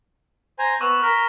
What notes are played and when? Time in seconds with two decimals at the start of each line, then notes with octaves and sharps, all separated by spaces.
0.59 C5 G#5 A#5
0.81 B3 C#6 E6 F#6 E7 F7
1.02 A#4 F6 B6